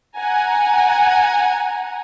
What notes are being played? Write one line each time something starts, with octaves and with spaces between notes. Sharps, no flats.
F#5 G#5 A#5